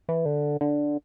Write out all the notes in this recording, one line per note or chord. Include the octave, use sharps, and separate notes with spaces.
E3
D3
D3